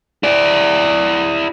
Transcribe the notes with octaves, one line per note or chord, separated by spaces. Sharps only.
E4 D5